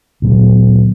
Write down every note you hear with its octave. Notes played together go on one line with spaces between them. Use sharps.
D2 A#2 F#3 B3